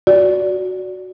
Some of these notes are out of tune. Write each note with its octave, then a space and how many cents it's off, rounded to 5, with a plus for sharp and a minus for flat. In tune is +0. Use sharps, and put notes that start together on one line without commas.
F#4 +0 D5 -15